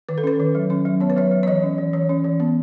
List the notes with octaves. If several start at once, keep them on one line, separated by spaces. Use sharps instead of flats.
D#3 B4
A4
C#4 B4
D#3
F#3
C#4
F#3
B3 C#5
B4
F#3 C#5
F#3
C#5
E3 D#5
C#4
E3
E3 C#5
C#4
E3
B3